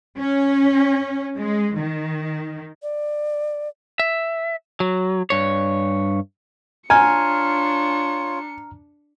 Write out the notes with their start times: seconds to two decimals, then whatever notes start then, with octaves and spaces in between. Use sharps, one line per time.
0.18 C#4
1.36 G#3
1.76 D#3
2.82 D5
4.00 E5
4.80 F#3
5.30 G2 C#5
6.90 D4 F4 C#5 G#5 A#5 F6 C#7